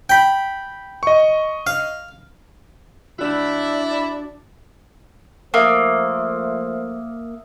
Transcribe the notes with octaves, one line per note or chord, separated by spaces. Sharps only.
G5 B5
D#5 C#6
F5
D4 E4 F#4 D5
F3 A3 A#3 C5 E5 D#6 E6